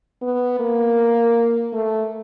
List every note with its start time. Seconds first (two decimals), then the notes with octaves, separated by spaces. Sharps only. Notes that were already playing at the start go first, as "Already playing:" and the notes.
0.22 B3
0.60 A#3
1.73 A3